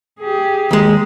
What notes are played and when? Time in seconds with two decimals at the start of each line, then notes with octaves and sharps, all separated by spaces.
0.20 G4 G#4
0.71 D#2 G#3